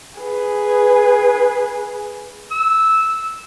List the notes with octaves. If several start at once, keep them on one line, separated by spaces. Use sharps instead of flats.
G#4 B4
E6